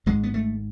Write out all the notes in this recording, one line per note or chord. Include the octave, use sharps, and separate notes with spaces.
G#1 G#2 G#3
B3
A3